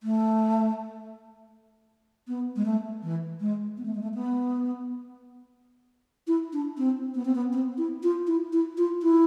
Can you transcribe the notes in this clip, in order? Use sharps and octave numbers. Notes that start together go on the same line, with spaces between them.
A3
B3
G#3
A3
E3
G#3
B3
A3
G#3
A3
B3
E4
D4
C4
B3
C4
B3
C4
E4
F4
E4
E4
F4
E4